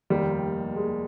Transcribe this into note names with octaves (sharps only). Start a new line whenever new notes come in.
F1 D#2 D#3 G3
G#3